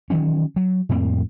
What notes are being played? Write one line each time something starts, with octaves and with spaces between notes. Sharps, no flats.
D#3 E3 F#3 C#4
F#3
F2 A2 A#3 C4